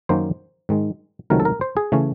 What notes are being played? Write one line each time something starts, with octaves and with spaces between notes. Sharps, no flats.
F#2 D#3 F#3 A#3 C#4 C5
G#2 D#3 G#3
C#2 C3 D#3 F#3 A3 A#4
A4
A#4
C5
G#4
C#3 E3 A3 C#4